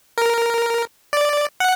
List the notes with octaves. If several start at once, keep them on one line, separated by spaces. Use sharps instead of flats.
A#4
D5
F#5